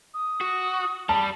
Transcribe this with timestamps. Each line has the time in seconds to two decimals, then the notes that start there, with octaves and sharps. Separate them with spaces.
0.14 D#6
0.41 F#4
1.09 G3 A5 B5